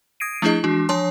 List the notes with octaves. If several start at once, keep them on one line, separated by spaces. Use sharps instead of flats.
D#6 G#6 A#6 C7 D7 D#7
F3 A3 D4 E4 G#4 D#5
E3 G#3 D4 F#4
F3 D4 C#5 G#5 A5 C6